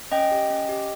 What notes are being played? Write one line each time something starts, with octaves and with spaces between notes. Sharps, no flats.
C#4 D#5 G5
G4
C#4
G4